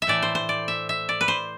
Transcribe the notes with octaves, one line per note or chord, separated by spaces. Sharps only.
E5
A2 E3 A3 D5
C5
C5
D5
E5
E5
D5
B4
C5